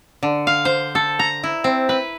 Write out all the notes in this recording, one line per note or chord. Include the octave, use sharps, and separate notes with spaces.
D3
F5
C5
A4
A#5
E4
C4
B4